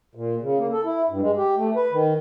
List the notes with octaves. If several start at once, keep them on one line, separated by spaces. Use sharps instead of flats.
A#2
C#3
A#3
A4
E4
G2
G#3
G4
A3
B4
D#3